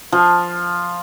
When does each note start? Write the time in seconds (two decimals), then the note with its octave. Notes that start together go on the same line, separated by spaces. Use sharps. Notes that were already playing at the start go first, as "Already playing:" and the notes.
0.12 F3